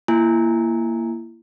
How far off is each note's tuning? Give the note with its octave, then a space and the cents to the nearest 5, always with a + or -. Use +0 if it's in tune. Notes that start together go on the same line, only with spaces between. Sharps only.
A#3 +0 E4 +30 G#5 +0